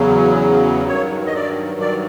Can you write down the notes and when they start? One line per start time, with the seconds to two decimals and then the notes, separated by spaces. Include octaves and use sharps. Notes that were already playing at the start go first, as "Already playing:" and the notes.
Already playing: E2 C#3 F#3
0.88 G2 D#3 F#3 C#5
1.27 D#5
1.35 D5
1.80 D5